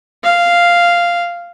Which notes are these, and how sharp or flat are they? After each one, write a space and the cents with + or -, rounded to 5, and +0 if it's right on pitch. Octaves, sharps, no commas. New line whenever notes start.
F5 -5